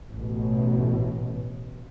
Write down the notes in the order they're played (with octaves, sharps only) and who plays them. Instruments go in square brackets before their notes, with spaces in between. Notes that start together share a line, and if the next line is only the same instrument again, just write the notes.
[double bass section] A1 B2